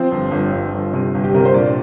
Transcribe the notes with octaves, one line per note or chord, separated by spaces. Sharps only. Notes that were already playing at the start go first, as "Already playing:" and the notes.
Already playing: F3 C4 C5
G1
G1
G1
G1
C3
G1
G4
C3 A#4
C5
A#2 D4 D5